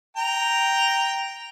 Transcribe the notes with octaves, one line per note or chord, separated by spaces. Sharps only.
G5 A#5